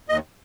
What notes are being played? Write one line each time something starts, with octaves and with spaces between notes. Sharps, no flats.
D#2 D#5